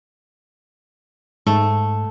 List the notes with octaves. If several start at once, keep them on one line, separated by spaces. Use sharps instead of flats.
G#2 A3